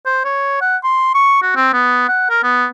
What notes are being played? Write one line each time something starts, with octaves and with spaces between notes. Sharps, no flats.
C5
C#5
F#5
C6
C#6
F#4
C4
B3
F#5
A#4
B3